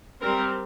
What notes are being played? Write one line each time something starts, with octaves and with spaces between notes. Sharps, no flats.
G3 C4 A#4